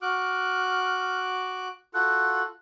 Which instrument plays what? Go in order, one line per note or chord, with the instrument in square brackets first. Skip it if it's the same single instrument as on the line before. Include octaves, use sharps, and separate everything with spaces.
[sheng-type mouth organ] F#4 D6 F#6 [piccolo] F6
[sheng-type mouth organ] F4 F#4 A4 [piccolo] F#6